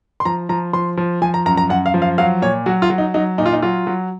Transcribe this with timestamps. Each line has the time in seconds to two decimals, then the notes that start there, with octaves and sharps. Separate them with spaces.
0.20 C6
0.25 F3 A#5
0.49 F3 A#5
0.73 F3 C6
0.97 F3
1.22 F3 G#5
1.34 A#5
1.46 F#2 A#5
1.57 A#5
1.69 F#2 F#5
1.86 F5
1.94 F3
2.02 F5
2.18 F#3 F5
2.42 A#2 C#5
2.66 F#3 F#4
2.82 F4
2.90 F#3
2.98 D#4
3.14 F#3 D#4
3.38 A#2 D#4
3.46 F4
3.53 D#4
3.62 F#3 F4
3.87 F#3